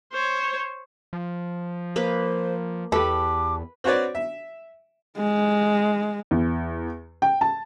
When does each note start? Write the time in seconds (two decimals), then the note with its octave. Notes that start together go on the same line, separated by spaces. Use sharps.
0.13 C5 C#5
1.13 F3
1.96 A#3 B4 C5
2.92 E2 G4 A4 B4 D6
3.84 C4 F#4 B4 C#5 D5
4.15 E5
5.18 G#3
6.31 E2
7.22 G5
7.41 A5